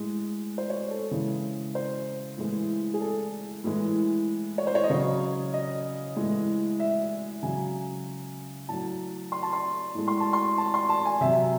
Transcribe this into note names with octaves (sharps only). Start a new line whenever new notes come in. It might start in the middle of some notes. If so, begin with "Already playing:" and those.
Already playing: A2 G#3
C5
C#5
A4
C#3 E3 G#3
C5
A2 E3 G#3
G#4
A4
A2 E3 G#3
C#5
C5
C#5
D#5
C#3 F#3 C#5
D#5
A2 E3 G#3
E5
C#3 F#3 G#5
A2 F#3 A5
C6
A5
C6
A2 G#3
C6
A5
C6
A5
C6
A5
G#5
C3 F#3 E5